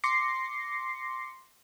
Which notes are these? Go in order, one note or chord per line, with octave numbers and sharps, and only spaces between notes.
C6 D6 A#6 C7 C#7